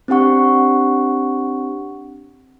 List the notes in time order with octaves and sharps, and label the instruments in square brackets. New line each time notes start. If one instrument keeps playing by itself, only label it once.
[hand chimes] C4 D4 G4 F#5 C#6